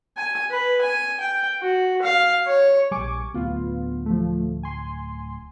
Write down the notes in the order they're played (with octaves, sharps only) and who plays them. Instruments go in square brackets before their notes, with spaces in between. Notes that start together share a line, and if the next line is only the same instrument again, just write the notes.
[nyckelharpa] G#5
B4
G#5
G5
F#4
F5
C#5
[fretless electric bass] A#1 G3 [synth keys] G#5 C#6 D6
[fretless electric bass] D1 D2 [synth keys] B3 F4
[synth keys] F3 A3
G#5 C6